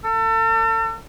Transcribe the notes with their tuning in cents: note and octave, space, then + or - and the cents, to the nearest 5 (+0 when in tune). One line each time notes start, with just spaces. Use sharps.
A4 +40